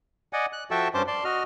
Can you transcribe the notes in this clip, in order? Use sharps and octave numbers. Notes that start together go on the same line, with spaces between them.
D5 D#5 F#5 G#5
F#6
F3 F#4 A4 E5 G5 A5
G2 C#4 C5 A5 C6 D6
D5 A5 C6
F#4 D#5 F6